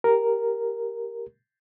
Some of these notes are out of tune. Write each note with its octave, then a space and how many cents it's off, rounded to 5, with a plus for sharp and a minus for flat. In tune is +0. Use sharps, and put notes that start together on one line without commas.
G4 +0 A#4 +0